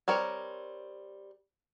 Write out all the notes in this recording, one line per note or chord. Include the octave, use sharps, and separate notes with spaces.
G3 C4 A#4 C#5